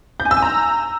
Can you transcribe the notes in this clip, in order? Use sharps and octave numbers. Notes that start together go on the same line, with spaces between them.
G6
G#5
E6
G#5
A#5